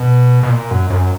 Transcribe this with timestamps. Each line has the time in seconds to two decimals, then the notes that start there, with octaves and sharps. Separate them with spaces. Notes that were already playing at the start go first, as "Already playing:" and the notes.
Already playing: B2
0.43 B2
0.50 A#2
0.71 F#2
0.90 F#2